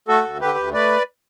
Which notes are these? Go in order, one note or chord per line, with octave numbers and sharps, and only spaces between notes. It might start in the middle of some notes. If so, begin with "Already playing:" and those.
A3 F#4 A4
D2
D3 G4 B4
D2
A3 B4 D5